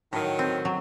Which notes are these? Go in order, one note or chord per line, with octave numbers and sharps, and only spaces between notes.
A2 D#3 F#3
C4
F#3